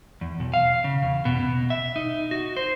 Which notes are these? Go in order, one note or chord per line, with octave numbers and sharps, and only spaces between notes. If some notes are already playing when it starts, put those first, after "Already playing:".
E2
B1
F5
C#3
E2
B2
B2
E5
D#4
F#4
C5